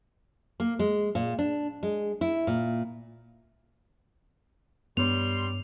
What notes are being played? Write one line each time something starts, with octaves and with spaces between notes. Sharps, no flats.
A#3
G#3
A#2
D4
G#3
E4
A#2
G2 G3 B3 C#5 C6 F7